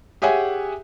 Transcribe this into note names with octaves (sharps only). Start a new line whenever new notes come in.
G4 G#4 C#5 E5 F#5 G#5